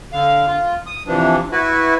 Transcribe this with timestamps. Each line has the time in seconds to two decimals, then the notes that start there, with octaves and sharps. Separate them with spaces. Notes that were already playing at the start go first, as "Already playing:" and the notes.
0.13 D3 F5
0.47 F4
0.86 D#6
1.07 C3 E3 F3 D4
1.52 E4 F#4 B4